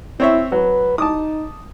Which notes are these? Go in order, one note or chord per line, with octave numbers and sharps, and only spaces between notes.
C4 E4 C#5 E5
F#3 B4
D#4 A5 D6 D#6